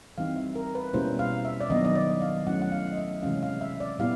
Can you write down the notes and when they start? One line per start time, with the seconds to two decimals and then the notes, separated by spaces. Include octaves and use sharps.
0.18 E3 G3 C4 D#4 F5
0.36 E5
0.55 A#4
0.75 B4
0.93 B2 G3 A#3 C#4 E4 C5
1.19 F5
1.45 E5
1.61 D5
1.70 D#3 F#3 B3 D4 D#5
1.85 D#5
1.95 D5
2.22 F5
2.47 F#3 A3 C#4 E4 F#5
2.62 F#5
2.72 F5
2.92 D#5
2.97 E5
3.22 C3 E3 G#3 C#4 F5
3.43 F5
3.61 E5
3.80 D5
3.99 A#2 G3 B3 E4 F5